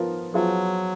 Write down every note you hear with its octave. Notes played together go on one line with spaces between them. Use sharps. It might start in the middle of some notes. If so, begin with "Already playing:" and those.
Already playing: F3 B3 F4 A#4
F3 F#3 B3 F4 G#4